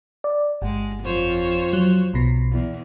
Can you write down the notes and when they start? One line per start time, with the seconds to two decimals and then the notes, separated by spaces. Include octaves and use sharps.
0.24 D5
0.62 G1 G#3
1.03 F2 C5 C#5
1.73 F#3
2.14 B1 B2
2.52 E2